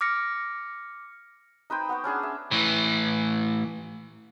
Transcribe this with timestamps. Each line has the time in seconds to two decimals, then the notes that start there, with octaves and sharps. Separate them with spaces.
0.01 D6 F6 A#6 C#7
1.70 D#4 B4 C5 G5
1.89 B3 F#5 C#6
2.04 C#4 D4 G#4 A5
2.23 E5
2.51 A2 E3